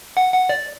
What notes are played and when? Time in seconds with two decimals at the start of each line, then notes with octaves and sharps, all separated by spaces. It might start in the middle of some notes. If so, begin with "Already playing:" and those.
0.17 F#5
0.33 F#5
0.49 D5